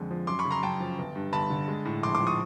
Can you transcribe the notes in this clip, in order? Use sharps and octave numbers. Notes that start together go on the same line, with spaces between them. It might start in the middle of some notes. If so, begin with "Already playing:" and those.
Already playing: F2 D3 G#3
F3
F#2 C6 D6
B5 C#6
C#3
A#5 C6
F#2 G5 A5
F3
G1
G2
G1 A5 B5
D3
G#3
A2
A#1 C6 D6
C6 D6
F3
C#6 D#6